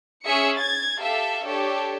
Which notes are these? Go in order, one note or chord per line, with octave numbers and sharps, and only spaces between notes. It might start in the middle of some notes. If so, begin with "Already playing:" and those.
C#4 G#4 E5 C#7
G#6 A6
G4 A4 E5 F5
D4 G4 A4 C#5